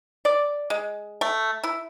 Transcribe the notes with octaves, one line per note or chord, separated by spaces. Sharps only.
D5
G#3
A3
E4